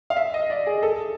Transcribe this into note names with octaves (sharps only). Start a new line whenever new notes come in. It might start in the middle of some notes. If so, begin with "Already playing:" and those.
F5
E5
D#5
D5
G#4
A4